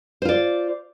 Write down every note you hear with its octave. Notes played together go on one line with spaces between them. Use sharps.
F4 C5 D5